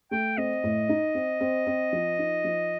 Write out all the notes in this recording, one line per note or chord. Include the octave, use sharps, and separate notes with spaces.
A3 G5
C4 D#5
A2
D#4
C4
C4
C4
F3
D#4
F3